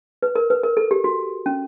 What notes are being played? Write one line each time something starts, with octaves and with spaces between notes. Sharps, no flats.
B4
A#4
B4
A#4
A4
G4
F#4
C#4